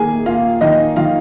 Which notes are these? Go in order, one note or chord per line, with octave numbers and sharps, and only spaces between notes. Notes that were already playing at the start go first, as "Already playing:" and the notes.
Already playing: D#3 A#3 G#4 G#5
A#3 F4 F5
D#3 D#4 D#5
D#3 F4 F5